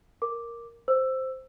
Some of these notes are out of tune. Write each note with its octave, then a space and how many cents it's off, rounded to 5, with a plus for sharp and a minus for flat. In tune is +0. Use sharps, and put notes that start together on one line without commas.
A#4 +0 D6 +0
C5 +0 E6 +10